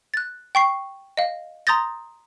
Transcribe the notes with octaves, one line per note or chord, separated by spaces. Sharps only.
F#6 A6
G5 C#6 C7
D#5 F5
A#5 C6 D#6 G6 A6 A#6